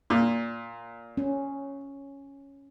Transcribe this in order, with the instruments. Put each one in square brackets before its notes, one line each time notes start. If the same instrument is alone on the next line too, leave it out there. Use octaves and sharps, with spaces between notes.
[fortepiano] A#2
[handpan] C#4